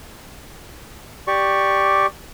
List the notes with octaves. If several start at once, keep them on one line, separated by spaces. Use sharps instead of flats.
G4 D5 C#6